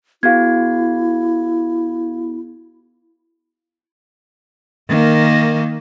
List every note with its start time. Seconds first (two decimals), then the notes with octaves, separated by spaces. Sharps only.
0.23 B3 E4 F#4 G#4 F5 G#6
4.89 D#3 A#3